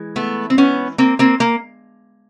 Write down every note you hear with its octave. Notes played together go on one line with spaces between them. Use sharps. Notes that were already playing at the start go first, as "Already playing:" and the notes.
Already playing: E3 G#3
A3 B3
C4
B3 C#4
A#3 C4
A#3 C4
A#3